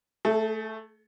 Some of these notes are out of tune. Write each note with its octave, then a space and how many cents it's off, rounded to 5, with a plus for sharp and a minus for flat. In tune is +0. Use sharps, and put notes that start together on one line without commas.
A3 +0 G#4 +45